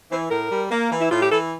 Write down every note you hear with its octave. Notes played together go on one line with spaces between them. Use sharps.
E3 C5
A2 A#4
G3
A#3
E3
E4
A2 F4
G4
E3 A4